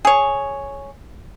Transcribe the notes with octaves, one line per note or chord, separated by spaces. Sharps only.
G#4 C#5